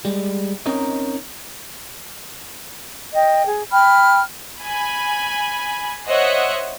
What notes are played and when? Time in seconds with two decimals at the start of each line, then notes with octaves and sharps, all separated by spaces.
0.05 G3 G#3
0.66 C4 C#4 D#4 A#4 C#5 D#5
3.13 D#5 G5
3.46 G#4
3.71 G5 B5 F6
4.61 G#5 B5
6.08 C5 C#5 D#5 E5 F#5